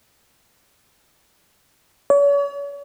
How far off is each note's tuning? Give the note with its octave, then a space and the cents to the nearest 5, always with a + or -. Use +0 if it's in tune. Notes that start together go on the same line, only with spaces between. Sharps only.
C#5 +40